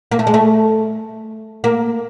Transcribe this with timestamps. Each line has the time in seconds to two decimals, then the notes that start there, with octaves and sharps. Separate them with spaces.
0.12 A#3
0.19 A3
0.27 G#3
0.34 A3
1.64 A#3